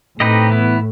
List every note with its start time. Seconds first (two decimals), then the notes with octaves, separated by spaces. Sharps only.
0.20 A2 C4 D#4 G4 B4 D#5
0.50 E3 B3 E4